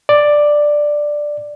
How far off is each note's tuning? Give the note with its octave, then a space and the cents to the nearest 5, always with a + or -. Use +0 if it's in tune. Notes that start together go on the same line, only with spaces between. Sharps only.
D5 +5